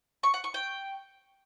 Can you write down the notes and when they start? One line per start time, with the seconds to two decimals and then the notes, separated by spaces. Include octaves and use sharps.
0.23 C#6
0.34 F#5
0.44 C#6
0.54 G5